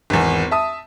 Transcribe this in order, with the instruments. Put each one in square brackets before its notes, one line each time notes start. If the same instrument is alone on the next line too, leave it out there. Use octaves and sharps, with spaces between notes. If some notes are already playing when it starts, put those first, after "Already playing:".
[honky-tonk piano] G#1 E2
E5 A5 D#6